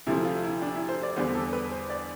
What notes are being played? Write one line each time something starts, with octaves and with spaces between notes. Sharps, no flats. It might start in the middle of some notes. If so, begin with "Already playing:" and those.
D2 C3 F3 A3 C4 E4
F4
E4
D4
E4
C5
D5
E2 D3 G3 B3 C5
A4
B4
C5
D5